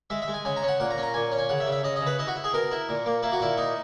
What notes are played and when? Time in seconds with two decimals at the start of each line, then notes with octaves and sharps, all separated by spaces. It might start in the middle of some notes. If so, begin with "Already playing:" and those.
0.10 G#3 E5
0.22 E5
0.28 G#3
0.34 G#5
0.45 C#3 G#5
0.57 A#5
0.63 C#4
0.68 F#5
0.80 A#2 F#5
0.91 A#5
0.98 C#4
1.03 A#5
1.14 A#2 G#5
1.32 C#4
1.38 G#5
1.49 C#3 F#5
1.60 E5
1.66 C#3
1.72 E5
1.83 C#3 D#5
1.96 D#5
2.01 C#3
2.07 B4
2.19 E4 D#5
2.27 F#4
2.36 E4
2.44 G#4
2.53 B2 A#4
2.71 E4
2.89 A#2
3.06 A#3
3.23 A#3 E4
3.32 F#4
3.40 A#2 E4
3.57 D#4